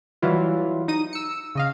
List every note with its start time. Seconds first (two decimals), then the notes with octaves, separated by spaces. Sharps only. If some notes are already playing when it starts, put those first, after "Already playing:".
0.22 E3 F#3 G3 E4 F4
0.88 D#4 D#6 D#7
1.13 E6 C#7
1.55 C#3 D#5 F5